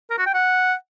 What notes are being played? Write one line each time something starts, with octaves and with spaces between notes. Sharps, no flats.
A#4
F#4
G5
F#5